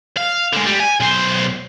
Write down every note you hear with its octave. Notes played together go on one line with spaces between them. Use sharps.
F5
D3 G#3
G3
G#5
B1 C5